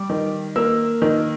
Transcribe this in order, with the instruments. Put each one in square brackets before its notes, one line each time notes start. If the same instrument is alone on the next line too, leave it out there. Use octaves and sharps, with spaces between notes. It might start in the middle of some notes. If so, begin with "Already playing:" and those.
Already playing: [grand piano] G3 D6
D#3
A#3 E6
D#3